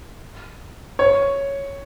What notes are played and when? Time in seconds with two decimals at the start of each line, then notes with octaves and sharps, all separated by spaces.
0.99 C#5